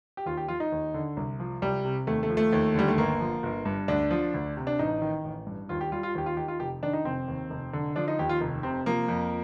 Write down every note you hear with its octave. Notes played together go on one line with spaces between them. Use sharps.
G4
D#2 F4
G4
F3 F4
D#4
D#2
D3
C2
F3
C2 G3
C3
D#2 A3
A3
F3
A3
D#2
D3 G3
A3
G1 A#3
F3
G1
G2
D2 D4
F3
D2
C3
D4
A1 D#4
D#3
A1
G2
D#2 F4
G4
G3 F4
F4
D#2 G4
F4
D#3 G4
F4
F1 G4
D#3 D4
D#4
F1 C4
D#2
F1
D3
F3 D4
D#4
D#2 G4
F4
F1
C3 C4
F3 A#3
F2